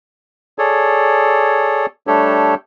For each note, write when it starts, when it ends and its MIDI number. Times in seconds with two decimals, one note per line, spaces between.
0.58 1.86 68
0.58 1.86 69
0.58 1.86 73
0.58 1.86 74
2.07 2.55 55
2.07 2.55 57
2.07 2.55 62
2.07 2.55 67
2.07 2.55 69
2.07 2.55 73